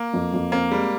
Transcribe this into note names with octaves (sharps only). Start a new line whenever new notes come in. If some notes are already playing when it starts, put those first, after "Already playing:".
Already playing: A#3
F2
F2
A#3 C4
G3 G#3